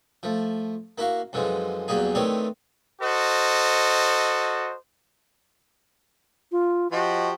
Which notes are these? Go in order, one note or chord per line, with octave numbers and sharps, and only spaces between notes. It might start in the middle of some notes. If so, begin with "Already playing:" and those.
F3 A3
A#3 E4 F#4 F5
F#2 D3 E3 F3 G#3
E2 F#3 G3 A#3 G#4
D#3 E3 A3 C4 C#5 D5
F#4 A4 C5 D#5
F4
F3 F#4 G4 D#5